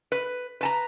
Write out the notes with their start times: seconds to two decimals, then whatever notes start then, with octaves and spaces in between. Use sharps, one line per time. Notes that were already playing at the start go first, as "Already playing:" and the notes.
0.12 B4
0.61 B4 A5 A#5